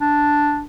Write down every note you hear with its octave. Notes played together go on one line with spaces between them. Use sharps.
D4